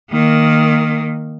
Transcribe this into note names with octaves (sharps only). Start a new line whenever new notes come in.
D#3 A#3